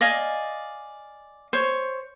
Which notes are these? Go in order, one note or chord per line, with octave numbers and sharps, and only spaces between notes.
D5 D#5 F5 G#5
C5 C#5